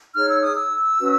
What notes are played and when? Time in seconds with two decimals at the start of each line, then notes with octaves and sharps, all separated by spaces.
0.14 D#4 G#4 C#5 F6
0.29 E6
0.42 D#6
0.54 E6
1.00 C#4 F#4 B4